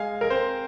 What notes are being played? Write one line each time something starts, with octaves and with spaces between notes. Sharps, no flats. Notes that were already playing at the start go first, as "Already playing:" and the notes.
Already playing: G#3 F5 G#5
A#4
C4 C5